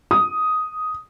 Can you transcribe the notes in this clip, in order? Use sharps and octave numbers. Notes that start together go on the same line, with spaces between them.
D#6